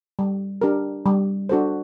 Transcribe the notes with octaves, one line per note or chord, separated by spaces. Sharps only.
G3
D4 G4 A#4
G3
D4 F#4 A4 C5